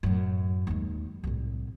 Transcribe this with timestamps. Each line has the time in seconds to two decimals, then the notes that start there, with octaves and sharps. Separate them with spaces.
0.03 F#2 A2
0.67 D#2 G#3
1.24 C2 A2